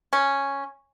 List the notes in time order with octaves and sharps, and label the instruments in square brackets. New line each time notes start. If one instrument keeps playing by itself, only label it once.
[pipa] C#4